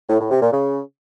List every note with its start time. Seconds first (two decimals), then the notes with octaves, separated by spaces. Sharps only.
0.10 A2
0.20 A2
0.31 C3
0.42 A#2
0.53 C#3